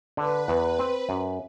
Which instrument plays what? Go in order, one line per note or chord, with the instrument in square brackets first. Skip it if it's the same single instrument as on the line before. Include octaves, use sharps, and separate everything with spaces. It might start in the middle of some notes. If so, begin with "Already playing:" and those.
[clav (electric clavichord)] D3 [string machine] B4
[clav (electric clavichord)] E2
C4
F#2